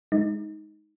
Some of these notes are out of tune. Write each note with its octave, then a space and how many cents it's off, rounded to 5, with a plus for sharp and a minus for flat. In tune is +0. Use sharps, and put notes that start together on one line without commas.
G#3 +0 D#4 +10